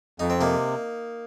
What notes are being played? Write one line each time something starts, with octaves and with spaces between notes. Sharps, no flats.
F2 D#4
C4
C3 A#3 D#4